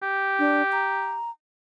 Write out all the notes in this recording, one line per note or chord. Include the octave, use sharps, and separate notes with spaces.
G4
D4
A#5